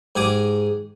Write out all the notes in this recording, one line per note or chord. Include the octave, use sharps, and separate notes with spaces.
G#2 G4 G#4 G#5 D6